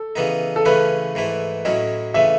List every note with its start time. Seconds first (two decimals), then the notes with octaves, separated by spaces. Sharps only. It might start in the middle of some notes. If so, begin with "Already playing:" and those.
Already playing: A4
0.16 C#3 E3 B3 D#4
0.56 A4
0.65 C#3 E3 A3 C#4 B4
1.15 G#2 E3 A3 E4
1.65 A2 F#3 C#4 E4 D#5
2.14 C#3 E3 A3 E5